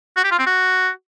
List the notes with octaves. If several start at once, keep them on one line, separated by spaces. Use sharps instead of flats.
F#4
G4
F4
C4
F#4